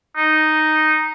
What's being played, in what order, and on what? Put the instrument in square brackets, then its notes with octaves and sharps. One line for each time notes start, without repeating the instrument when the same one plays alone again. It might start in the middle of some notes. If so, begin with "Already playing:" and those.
[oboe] D#4